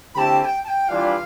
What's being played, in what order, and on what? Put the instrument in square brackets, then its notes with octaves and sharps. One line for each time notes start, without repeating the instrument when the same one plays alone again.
[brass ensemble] D3 A3 C4 E4 G4 [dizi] A5 B5
[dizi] A5
G5
A5
G5
[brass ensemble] E3 G3 D4 F4 [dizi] F5